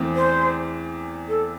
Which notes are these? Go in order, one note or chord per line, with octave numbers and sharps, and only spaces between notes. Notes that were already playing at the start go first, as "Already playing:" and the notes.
Already playing: E2 E3 A3 C4
C5
A4